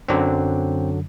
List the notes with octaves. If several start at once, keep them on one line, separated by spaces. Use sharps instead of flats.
F#2 D3 F#3 C4